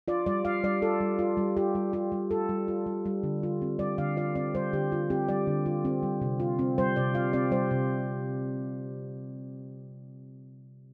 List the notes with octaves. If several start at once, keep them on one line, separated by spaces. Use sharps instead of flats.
F4 D5
G3 D5
F4 F5
G3 D5
F4 A4
G3
F4
G3
F4 G4
G3
F4 G4
G3
F4 A4
G3
F4
G3
G3
D3
F4
C4
G3 D5
D3 F5
F4 D5
C4 D5
G3 C5
D3 G4
F4
C4 G4
G3 D5
D3
F4
C4
G3
C3
F4
C4
G3 C5
C3 D5
F4 F5
C4 D5
G3 C5
C3